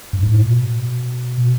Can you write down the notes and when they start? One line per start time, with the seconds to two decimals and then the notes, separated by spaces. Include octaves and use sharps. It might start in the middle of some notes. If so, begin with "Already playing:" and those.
0.13 G2
0.23 G#2
0.31 A2
0.41 A#2
0.50 B2